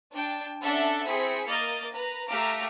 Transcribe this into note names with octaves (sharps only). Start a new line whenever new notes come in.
D4 G5 A5
C#4 D4 A4 E5 F#5 A5
C4 E4 G#4 B6 C#7
A#3 A#4 D#5 A6
B4 A#5
A3 G4 F5 A#5 D6